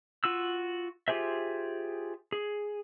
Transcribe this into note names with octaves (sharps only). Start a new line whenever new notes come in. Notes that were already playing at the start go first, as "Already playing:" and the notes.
F4 F#4 E6
F4 G4 G#4 C5 E5
G#4